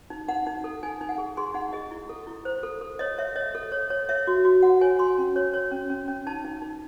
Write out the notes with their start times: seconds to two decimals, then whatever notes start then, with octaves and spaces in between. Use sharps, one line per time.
0.10 D#4
0.28 D#4 F#5
0.47 D#4
0.64 A4
0.83 D#4 G#5
1.01 D#4
1.09 F#5
1.18 G#4
1.37 G#4 C6
1.54 D#4 F#5
1.73 G#4 D#5
1.91 E4
2.09 A4
2.27 E4
2.45 C5
2.63 A4
2.81 A4
2.99 C#5 D#5
3.18 C#5 E5
3.36 C#5 D#5
3.55 A4
3.72 C#5
3.90 C#5
4.09 C#5 E5
4.27 F#4
4.45 F#4
4.62 F#4 F#5
4.81 C#5 G#5
4.99 F#4 C6
5.18 C#4
5.36 C#5
5.54 C#5
5.72 C#4
5.90 C#4
6.08 C#4
6.27 D#4 A5
6.45 D#4
6.62 D#4